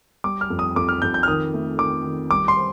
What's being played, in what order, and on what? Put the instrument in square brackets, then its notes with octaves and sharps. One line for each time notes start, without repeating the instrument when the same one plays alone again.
[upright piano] G3 [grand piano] D6
[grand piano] F6
[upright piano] F2
[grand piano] D#6
[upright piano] F2 [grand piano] D6
[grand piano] F6
[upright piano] F2 [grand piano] G6
[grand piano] G6
F6
[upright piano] D#3 [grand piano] D#6
[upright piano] A3
[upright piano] D#3 [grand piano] D6
[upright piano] D#3
[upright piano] G3 [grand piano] D6
[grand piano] C6
[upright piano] C5